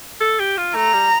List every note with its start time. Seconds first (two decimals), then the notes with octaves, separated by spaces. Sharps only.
0.21 A4
0.39 G4
0.58 F4
0.75 A3 A#5
0.93 G3